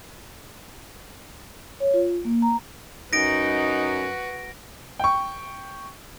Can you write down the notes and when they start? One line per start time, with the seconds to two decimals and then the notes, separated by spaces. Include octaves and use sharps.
1.80 C#5
1.94 F4
2.25 A#3
2.42 A#5
3.13 F#2 D#4 F#4 B4 A#6 D7
4.99 G5 C#6